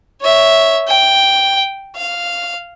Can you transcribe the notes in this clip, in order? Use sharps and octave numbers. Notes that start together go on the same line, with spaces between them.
C#5 E5
G5
F5